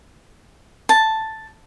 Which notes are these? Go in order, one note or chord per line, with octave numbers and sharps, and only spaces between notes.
A5